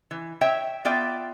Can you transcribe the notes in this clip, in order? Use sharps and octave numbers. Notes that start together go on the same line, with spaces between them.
E3
C#5 E5 G5
B3 F4 D5 E5 G5